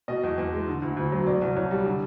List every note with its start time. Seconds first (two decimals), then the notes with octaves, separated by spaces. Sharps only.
0.08 B2 D#5
0.23 E2
0.38 E2
0.53 G#3
0.67 D3
0.82 D2
0.97 D2
1.12 F#3
1.27 B2 D5
1.42 C2
1.57 C2 C#5
1.71 G3
1.86 D3